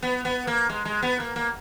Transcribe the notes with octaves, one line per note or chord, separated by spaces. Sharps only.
B3
B3
A#3
G#3
G#3
B3
A#3
A#3